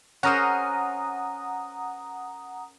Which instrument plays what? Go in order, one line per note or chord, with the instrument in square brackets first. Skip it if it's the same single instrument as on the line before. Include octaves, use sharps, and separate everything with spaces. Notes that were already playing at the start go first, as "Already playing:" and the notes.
[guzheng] C#4 A#4 C5 [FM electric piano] F#5 A#5 D#6